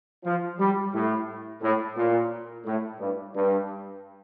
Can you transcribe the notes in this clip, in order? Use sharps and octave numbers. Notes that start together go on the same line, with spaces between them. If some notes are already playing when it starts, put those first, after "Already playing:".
F3
G3
A2
A2
A#2
A2
G2
G2